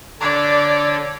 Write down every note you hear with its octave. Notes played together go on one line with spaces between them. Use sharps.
D3 D4 C#5 D5